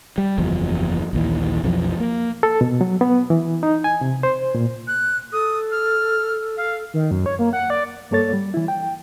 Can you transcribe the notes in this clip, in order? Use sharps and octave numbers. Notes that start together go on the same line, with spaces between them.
G3
F#1 E2 F3
A#1 D#2 E3
B1 F2 E3 F3
A#3
A4
B2
F#3
B3
E3
D#4
G#5
C3
C5
A#2
F#6
A4 D#6
F6
F5
D#3
F#2
C#5
A#3
F#5
D5
G2 A#3 A4 C#5 A6
G3
E3 E4
G5